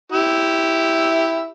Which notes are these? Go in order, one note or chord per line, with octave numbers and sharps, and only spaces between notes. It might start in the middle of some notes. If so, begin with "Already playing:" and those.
E4 G4 E5